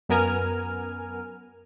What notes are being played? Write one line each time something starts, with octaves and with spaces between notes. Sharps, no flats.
F#2 B3 A#4 G#5 F6